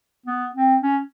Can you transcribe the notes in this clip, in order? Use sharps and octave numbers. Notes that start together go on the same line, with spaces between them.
B3
C4
C#4